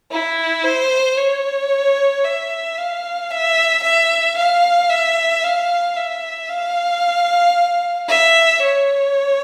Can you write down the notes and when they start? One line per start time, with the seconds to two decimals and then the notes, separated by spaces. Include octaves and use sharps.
0.11 E4
0.64 C5
1.17 C#5
2.24 E5
2.77 F5
3.30 E5
3.83 E5
4.37 F5
4.90 E5
5.44 F5
5.97 E5
6.50 F5
8.09 E5
8.63 C#5